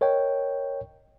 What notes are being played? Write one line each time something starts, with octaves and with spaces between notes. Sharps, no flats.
A#4 C#5 D#5 G5